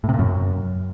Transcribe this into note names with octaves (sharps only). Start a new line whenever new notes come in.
A2
C3
A#2
F#2